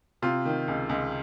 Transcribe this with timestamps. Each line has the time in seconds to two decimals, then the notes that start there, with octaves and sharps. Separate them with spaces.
0.22 C3 F4
0.45 D#3
0.68 C#2
0.89 C#2